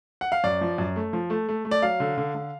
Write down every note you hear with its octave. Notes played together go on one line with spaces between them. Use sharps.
F#5
F5
F#2 D5
F3
F#2
A3
F3
A3
A3
A3
D5
F#3 F5
D3
D3
D3